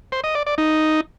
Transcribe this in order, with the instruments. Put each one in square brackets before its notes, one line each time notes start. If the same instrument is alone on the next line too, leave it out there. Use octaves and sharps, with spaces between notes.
[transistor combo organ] C5
D#5
D5
D5
D#4